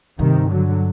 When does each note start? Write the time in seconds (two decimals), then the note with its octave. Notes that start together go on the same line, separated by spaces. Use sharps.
0.19 G2 C3 D#3
0.50 D3 F#3